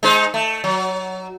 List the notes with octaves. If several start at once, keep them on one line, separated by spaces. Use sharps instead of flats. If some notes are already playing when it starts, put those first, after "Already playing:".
G#3 D#4 C5
A3
F#3